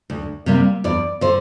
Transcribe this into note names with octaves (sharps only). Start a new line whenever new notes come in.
D2
C3 G3 A#3
E2 D5
D3 C5